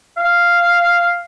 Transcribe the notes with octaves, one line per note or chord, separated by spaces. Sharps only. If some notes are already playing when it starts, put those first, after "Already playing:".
F5